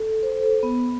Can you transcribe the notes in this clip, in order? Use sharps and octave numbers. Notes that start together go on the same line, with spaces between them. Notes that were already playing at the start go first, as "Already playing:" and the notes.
Already playing: A4
C5
A4
B3